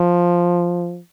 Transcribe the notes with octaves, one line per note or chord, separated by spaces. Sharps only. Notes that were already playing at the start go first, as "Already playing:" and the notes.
Already playing: F3